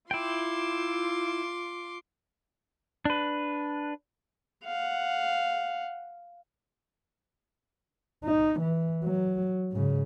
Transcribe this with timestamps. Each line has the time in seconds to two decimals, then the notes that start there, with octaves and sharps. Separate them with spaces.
0.11 E4 F4 G5 C6 D6
3.05 D4 B4
4.64 F5 F#5
8.24 D#4
8.60 E3
9.04 F#3
9.72 G#2 C#3